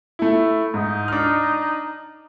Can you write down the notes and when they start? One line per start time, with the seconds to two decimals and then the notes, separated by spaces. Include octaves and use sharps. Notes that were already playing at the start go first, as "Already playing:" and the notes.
0.19 A3 E4
0.74 G#2 D#4
1.08 D4 F6